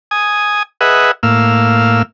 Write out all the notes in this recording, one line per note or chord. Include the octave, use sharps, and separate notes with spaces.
G#5 D#6
G#4 B4 D#5 E5 F#5
A2 A#3 F5 E6